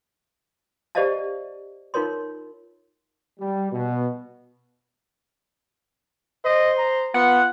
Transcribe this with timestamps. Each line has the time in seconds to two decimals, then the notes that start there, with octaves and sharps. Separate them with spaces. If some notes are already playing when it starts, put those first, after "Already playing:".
0.95 G4 C5 D5 D#5 F5 A5
1.94 D#4 F4 A#4 C#5 C6
3.40 G3
3.72 B2
6.45 C5 D#5
6.78 A#5
7.14 B3 F4 F#5